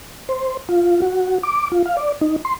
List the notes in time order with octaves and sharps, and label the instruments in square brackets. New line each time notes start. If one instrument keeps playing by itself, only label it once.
[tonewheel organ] C5
F4
F#4
D6
F4
F5
D5
D#4
C6